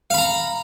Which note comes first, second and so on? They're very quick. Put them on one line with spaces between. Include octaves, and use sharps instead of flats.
F5 B5 A#5